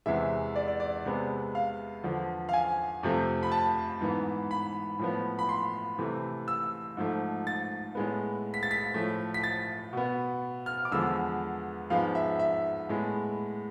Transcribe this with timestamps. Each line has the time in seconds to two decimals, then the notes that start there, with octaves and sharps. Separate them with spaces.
0.06 E2 C3 E3 G#3 E5
0.56 D5
0.68 D5
0.80 D5
1.05 C3 G#3 B3
1.55 F5
2.04 E2 D3 F3
2.49 F5
2.53 G#5
3.03 F2 C3 F3 A3
3.43 B5
3.52 A5
4.01 G#2 E3 B3
4.51 B5
4.99 A2 F3 B3
5.39 B5
5.49 C6
5.98 C3 E3 A3
6.48 E6
6.97 G#2 F3 A3
7.47 A6
7.95 A2 G#3 B3
8.54 B6
8.63 A6
8.71 B6
8.94 A2 F3 A3
9.34 B6
9.44 A6
9.93 B2 B3
10.66 F6
10.85 D6
10.91 E2 D3 F3 G#3 B3 E6
11.90 G#2 F3 G#3 B3 F5
12.15 E5
12.39 E5
12.89 A2 G#3 B3